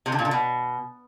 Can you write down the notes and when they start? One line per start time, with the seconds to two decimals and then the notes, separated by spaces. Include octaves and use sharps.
0.06 C3
0.12 D3
0.19 A#2
0.25 D3
0.31 B2